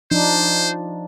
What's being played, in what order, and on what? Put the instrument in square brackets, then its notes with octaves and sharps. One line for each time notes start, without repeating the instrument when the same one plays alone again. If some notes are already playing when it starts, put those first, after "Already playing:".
[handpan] F3 D4 D#4 [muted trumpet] C5